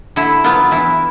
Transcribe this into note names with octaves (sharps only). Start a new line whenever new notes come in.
D3 E4
F#3 B3 F4
E3 E4